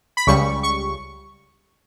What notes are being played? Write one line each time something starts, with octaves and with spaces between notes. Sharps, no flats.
B5
C#2 C#3 G3 C#6
C#6